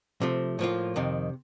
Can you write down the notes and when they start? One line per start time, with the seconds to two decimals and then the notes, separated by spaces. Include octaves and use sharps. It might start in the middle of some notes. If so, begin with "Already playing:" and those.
0.21 C3 F3 A3
0.59 A2 F3 A#3 F4
0.96 F2 C3 D#3